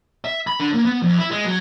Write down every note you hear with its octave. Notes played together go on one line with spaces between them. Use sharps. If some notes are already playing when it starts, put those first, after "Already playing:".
E5
B5
D3
A#3
B3
F2
E4
G#3
F#3